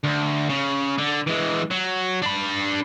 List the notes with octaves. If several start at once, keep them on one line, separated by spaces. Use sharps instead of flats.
D2
C#3
D3
E3 G#3
F#3
D4 B5